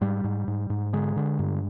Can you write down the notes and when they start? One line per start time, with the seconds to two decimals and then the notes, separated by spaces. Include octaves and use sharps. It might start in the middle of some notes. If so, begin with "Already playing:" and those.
0.01 G#2 G3
0.24 G#2
0.47 G#2
0.70 G#2
0.93 D3 G#3
1.16 D3
1.39 G2